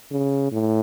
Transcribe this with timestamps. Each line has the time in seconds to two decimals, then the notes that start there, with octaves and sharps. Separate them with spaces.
0.12 C#3
0.52 A2